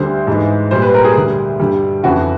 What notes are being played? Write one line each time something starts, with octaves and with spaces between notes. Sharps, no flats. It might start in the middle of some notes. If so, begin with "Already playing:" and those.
Already playing: D2 D3 G3 C5
G#2 E3 G#3
A#2 G3 C5
B4
A#4
G#4
D2 D3 G3
G2 D3 G3
F2 C#3 E3 F#4